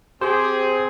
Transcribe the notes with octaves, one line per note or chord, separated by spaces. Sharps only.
C4 G4 G#4 C5